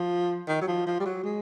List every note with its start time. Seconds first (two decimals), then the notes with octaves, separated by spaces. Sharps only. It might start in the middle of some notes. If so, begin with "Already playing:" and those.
Already playing: F3
0.48 D#3
0.62 F#3
0.68 F3
0.87 F3
1.00 G3
1.06 F#3
1.24 G#3